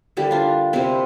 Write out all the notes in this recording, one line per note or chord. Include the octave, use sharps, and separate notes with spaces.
D3 G3 A#3 E4 G4
D4 F4
C3 G3 A#3 C4 E4